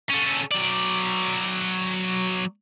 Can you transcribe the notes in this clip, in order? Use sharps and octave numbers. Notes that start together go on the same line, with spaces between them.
C#4 A4
F#3 D5